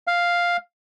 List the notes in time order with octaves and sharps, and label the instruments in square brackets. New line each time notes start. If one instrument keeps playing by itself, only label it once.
[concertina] F5